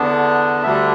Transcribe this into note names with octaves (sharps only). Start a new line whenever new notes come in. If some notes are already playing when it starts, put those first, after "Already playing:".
Already playing: E2 D3 B3 D4 A5
D2 D3 G3 D4 E5